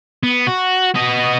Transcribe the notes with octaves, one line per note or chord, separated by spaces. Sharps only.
B3
F#4
B3 D#5